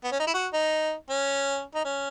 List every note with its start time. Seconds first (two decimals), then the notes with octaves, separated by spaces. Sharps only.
0.04 B3
0.12 C#4
0.20 D#4
0.27 E4
0.34 F#4
0.53 D#4
1.10 C#4
1.75 D#4
1.85 C#4